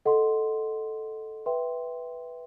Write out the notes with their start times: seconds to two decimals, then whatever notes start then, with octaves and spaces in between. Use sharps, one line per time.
0.05 A4 D#5 F#5 C6
1.46 B4 E5 G5 C6